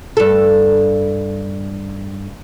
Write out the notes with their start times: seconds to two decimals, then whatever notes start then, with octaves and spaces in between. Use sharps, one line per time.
0.17 G2 A4